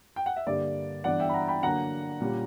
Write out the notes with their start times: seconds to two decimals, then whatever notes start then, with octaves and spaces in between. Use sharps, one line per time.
0.16 G5
0.26 F#5
0.36 E5
0.46 G2 D3 G3 A#3 D5
1.04 G2 E3 B3 D4 D5 F#5
1.20 E5 G5
1.29 B5
1.34 F#5 A#5
1.48 G5 B5
1.63 D3 F#3 A#3 D4 F#5 A#5
2.21 A#2 G3 C#4